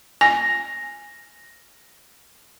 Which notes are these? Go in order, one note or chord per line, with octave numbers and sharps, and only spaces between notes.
G#5 A#6